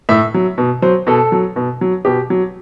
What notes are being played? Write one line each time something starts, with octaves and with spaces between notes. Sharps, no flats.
A2 E5
F#3
B2
F#3 C5
B2 A4
F#3
B2
F#3
B2 G4
F#3